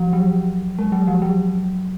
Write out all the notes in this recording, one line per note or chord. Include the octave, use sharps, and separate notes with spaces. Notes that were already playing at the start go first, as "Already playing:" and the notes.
Already playing: F3
F#3
G#3
F#3
F3
F#3